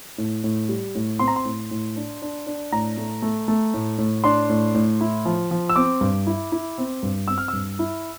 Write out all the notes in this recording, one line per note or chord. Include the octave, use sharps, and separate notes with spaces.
A2
A2
G3
A2
C4 C6
A#5
C6
A2
A2
D4
D4
D4
A2 A#5
A3
A3
A3
A2
A2
D4 C6
A2
A2
E4
F3
F3
E6
C4 D6
G2
E4
E4
C4
G2
C4 E6
F6
G2 E6
E4